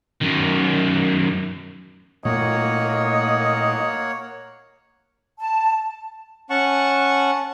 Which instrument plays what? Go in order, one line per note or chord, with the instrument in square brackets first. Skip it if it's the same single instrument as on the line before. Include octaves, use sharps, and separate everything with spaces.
[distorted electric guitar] F#2 D#3
[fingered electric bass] A#2 A3 [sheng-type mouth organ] A#3 C#5 F#5 [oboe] D#5
[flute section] A5
[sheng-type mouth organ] C#4 F#5 A5 C#6